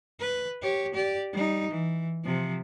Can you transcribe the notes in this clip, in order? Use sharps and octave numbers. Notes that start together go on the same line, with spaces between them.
B4
G4 C#5
G4 D5
G3 D#4
E3
C3 F3